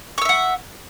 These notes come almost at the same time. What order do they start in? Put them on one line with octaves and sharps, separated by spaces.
C#6 E6 E5 F#5